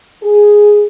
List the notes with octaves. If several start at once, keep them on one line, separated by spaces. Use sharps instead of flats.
G#4